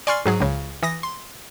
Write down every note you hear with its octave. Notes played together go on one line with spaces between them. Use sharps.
D5 G#5 C6 C#6 F6 C7
G#2 F#3 G#4
C#2 C#3
E3 D#6 A#6
C6